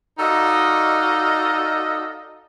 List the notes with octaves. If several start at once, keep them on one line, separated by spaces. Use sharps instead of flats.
D#4 F#4 A4 D5 D#5 F5